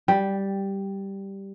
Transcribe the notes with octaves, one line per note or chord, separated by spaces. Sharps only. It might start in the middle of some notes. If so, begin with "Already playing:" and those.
G3